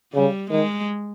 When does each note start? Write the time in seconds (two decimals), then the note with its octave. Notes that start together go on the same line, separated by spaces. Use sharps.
0.14 C#3 G3
0.50 D#3 G#3